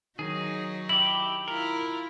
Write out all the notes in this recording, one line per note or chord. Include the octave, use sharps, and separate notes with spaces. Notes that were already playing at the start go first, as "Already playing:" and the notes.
D#3 F#3 D#4 G#4
E4 G4 F#7
E4 F4 A#4